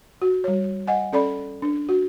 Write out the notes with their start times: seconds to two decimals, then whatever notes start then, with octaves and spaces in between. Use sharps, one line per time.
0.22 F#4
0.44 G3 C#5
0.87 D#5 F#5 G#5
1.13 C#4 A4 D5 B5
1.62 D4
1.89 F#4